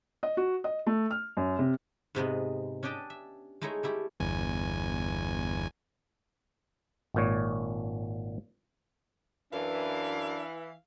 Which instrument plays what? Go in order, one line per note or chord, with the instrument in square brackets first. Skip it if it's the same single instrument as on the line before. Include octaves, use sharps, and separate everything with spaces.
[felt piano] D#5
F#4
D#5
A3
F6
F#2
C3
[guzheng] G#2 C3 G#3 B3
C#4 D4 G4 D#5 G5 A5
E5
G#3 A3 D#4 E4 C#5
G3 A3 E4 G4
[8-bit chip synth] G1 E2 G#5
[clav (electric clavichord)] G#1 A#2 C#5
[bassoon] F#2 [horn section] E3 [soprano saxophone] D4 [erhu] F5